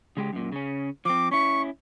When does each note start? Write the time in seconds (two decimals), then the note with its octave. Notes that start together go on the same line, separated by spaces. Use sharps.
0.17 C#3 G#3 G4
0.33 F#2 A#2
0.52 C#3 C#4
1.05 F3 C4 D6
1.31 C#4 E4 C#6